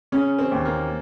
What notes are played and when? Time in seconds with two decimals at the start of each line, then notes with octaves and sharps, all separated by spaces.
0.12 C#3 C#4
0.39 C4
0.52 D#2
0.65 A#3